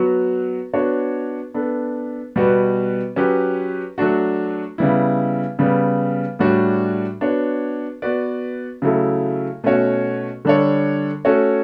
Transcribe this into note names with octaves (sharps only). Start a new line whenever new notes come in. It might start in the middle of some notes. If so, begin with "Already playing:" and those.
Already playing: F#3 B3 F#4
B3 D4 F#4 C#5
B3 D4 A4
B2 G3 B3 F#4 B4
F#3 C#4 G4 B4
F#3 A3 D4 F#4
C#3 G3 B3 E4
C#3 G3 B3
A2 G3 D4 F#4 C#5
B3 D4 F#4 C#5
B3 F#4 B4 D5
C#3 F#3 A3 E4 A4
B2 A3 C#4 F#4 C#5
D3 G3 D4 A4 C#5
A3 C#4 F#4 A4 C#5